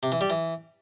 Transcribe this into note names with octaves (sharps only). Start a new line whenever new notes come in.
C3
E3
G3
E3